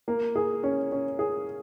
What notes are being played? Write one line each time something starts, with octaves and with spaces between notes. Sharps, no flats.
A#3
G#4
C#4
C#4
G#4